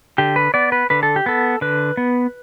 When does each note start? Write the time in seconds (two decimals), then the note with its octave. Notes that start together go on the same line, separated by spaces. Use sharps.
0.18 D3 G4
0.36 B4
0.54 B3 D5
0.72 B4
0.90 D3 B4
1.03 A4
1.16 G4
1.26 B3 A4
1.61 D3 B4
1.97 B3